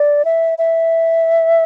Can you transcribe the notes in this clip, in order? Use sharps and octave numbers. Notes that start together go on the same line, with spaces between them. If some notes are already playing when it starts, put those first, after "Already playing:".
Already playing: D5
E5
E5